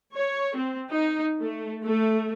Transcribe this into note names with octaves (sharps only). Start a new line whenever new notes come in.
C#5
C4
D#4
A3
A3